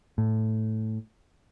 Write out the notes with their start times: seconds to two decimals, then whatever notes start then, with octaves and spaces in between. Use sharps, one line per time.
0.18 A2